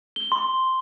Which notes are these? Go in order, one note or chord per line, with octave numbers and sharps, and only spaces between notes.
G7
C6